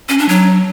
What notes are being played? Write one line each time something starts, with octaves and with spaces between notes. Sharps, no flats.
C#4
D4
F#3